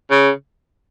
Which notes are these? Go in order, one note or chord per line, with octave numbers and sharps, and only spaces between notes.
C#3